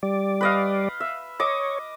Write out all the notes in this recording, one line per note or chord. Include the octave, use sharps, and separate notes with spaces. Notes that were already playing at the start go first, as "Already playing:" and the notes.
G3 D5
B4 D#5 F5
E5
C#5 D#5 D6